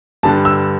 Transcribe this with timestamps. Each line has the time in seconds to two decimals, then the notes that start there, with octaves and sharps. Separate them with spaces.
0.23 G2 D3 G3 A5
0.45 E6